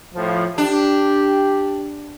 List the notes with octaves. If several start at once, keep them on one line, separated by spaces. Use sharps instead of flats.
A2 F3
D4 G4